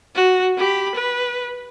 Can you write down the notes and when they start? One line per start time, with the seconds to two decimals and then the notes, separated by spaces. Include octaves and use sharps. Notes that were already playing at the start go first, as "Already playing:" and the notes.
0.15 F#4
0.58 G4 B5
0.95 B4